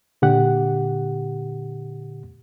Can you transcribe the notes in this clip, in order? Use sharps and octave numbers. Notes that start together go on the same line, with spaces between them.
A#2 D3 G4 F#5